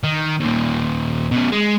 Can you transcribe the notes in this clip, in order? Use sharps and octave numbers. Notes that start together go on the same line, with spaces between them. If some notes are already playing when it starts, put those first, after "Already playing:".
D#3
D#2 A#2
B2 C#4
G#3